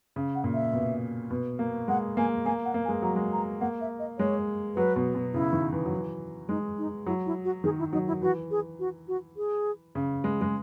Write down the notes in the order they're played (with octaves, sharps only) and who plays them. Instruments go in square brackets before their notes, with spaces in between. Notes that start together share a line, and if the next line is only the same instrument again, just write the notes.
[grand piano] C#3
[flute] F#5
[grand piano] A#2
[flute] E5
[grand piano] B2
B2
A#3
[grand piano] G#3 [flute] F#5
[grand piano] A#3 [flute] G#5
[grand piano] A#3 [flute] G#5
[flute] F#5
[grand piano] A#3
[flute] G#5
[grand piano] G#3
[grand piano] F#3 [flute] A#5
[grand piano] G#3
[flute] A#5
[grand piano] A#3 [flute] F#5
[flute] E5
D#5
[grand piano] G#3 [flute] C#5
[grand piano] F#3 [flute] B4
[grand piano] B2
B2
[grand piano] C#3 [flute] E4
[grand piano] D#3
E3
F#3
E3
[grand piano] G#3 [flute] D#4
[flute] D#4
[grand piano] F#3 [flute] E4
[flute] E4
F#4
[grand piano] D#3 [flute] G#4
[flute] E4
[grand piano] F#3 [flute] D#4
[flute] E4
[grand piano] E3 [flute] F#4
[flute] G#4
F#4
F#4
G#4
[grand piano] C#3
G#3
G#3